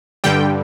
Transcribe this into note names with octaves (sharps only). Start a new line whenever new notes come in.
G2 D3 G3 G5